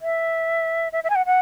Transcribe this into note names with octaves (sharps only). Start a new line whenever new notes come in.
E5
E5
E5
G#5
F#5
F#5